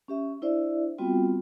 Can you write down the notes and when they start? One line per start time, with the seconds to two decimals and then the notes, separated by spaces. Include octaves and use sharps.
0.08 C#4 G4 E5
0.42 D4 E4 C5 D5 E5
0.98 G3 B3 C4 F4 F#4 G5